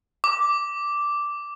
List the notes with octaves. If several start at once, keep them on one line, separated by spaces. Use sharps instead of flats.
D6